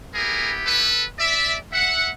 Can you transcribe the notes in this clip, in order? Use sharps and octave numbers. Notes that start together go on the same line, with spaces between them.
B3 E4 G4 G#4 A#4
A4 B4
D5 E5
E5 F#5